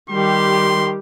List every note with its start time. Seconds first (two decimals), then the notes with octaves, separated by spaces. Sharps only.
0.10 D#3 G3 G4 C6